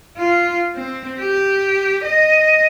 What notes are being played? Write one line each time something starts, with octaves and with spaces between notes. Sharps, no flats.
F4
C4
G4
D#5